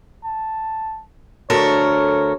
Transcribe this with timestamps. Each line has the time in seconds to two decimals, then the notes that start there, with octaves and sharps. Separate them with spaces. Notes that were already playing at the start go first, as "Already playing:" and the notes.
0.24 A5
1.50 D2 A4 A#4 C#5